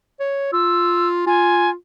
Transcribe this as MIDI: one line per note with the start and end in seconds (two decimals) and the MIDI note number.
0.20 0.51 73
0.53 1.26 65
0.53 1.08 88
1.26 1.74 65
1.26 1.70 80